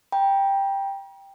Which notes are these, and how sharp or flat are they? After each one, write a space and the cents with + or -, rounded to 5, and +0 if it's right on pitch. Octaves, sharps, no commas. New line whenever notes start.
G5 +5 A#5 +45